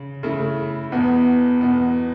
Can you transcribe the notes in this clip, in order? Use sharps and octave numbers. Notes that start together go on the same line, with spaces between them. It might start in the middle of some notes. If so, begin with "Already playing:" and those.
Already playing: C#3
C#3 A3 E4
E2 B2 B3
E2 B2 B3